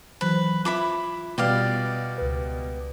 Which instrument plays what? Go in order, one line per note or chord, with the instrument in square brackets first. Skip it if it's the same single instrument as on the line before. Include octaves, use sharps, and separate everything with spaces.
[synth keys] E3 F#3 C5 [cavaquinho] B4
[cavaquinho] E4 B5 D6 [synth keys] F4
[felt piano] B2 G3 [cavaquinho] G4 D5 F5
[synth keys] C#2 B4